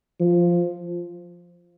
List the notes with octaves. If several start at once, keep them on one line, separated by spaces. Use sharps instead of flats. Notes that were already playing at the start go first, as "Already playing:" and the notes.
F3